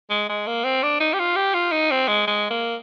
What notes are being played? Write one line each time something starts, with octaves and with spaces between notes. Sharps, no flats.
G#3
G#3
A#3
C4
D4
D#4
G4
F4
G4
F4
D#4
C4
G#3
G#3
A#3